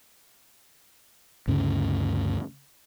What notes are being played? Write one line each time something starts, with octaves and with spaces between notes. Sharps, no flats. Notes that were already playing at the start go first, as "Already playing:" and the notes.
D2 G2 C#3 C#4